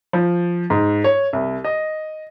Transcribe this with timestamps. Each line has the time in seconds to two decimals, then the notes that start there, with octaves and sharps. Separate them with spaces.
0.13 F3
0.70 G#2
1.04 C#5
1.33 C2
1.65 D#5